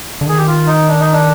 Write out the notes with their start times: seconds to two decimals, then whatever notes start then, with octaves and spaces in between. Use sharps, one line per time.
0.21 D3
0.26 D#3 G#4
0.37 G4
0.47 F4
0.67 D#4
0.88 D4
1.00 D#4
1.12 D4